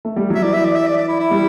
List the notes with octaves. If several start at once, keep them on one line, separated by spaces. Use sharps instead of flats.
A3
G3
F#3
E5
E3 D5
E5
D5
E5
D5
D5
E4
E4
G3